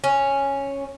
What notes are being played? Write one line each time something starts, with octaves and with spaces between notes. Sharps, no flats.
C#4